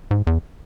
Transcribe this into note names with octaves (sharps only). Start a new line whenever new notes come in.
G#2
E2